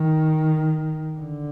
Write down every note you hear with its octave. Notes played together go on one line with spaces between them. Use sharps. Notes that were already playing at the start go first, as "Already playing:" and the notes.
Already playing: D#3
D3